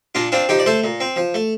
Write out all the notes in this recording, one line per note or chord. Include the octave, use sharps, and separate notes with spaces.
A#2 D4 F4
C4 D4 F4
F3 D#4 G4
D5
A3 A4 C5
A#2
C4
F3
A3